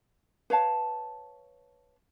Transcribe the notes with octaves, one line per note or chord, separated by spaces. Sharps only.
B4 C#5 F5 A5